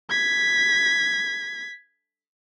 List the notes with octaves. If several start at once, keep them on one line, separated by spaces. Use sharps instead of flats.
G#6 B6